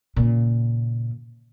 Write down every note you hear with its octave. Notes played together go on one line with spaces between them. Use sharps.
A#2 C#3